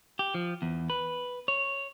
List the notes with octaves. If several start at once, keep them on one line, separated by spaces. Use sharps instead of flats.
G4
F3
E2
B4
C#5